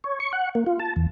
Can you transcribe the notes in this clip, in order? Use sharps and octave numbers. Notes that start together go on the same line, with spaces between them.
C#5
C#6
F#5
A#3
F4
A5
E2